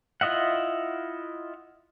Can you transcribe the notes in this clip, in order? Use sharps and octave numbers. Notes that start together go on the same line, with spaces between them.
E4 F4 D#5 E5 F#5